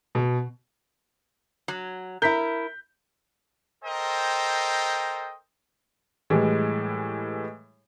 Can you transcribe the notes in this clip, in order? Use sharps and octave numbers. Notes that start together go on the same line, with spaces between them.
B2
F#3
E4 A#4 G6 B6
A4 A#4 C5 D#5 G5
A2 E3 G3 G#3